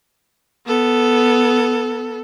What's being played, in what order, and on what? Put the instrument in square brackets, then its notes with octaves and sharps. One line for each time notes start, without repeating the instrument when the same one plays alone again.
[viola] B3 A4